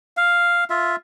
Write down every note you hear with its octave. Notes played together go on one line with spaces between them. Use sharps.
F5
F4 E5